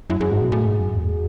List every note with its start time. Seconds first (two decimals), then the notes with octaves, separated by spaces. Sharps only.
0.10 F#2 E4
0.20 F#2 G#4
0.31 G#2 F#4
0.42 B2
0.52 A2 G#4
0.66 G#2
0.80 F#2
0.95 E2